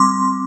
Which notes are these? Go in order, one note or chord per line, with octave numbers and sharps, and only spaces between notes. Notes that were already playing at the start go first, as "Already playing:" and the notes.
Already playing: G3 C4 C6 D6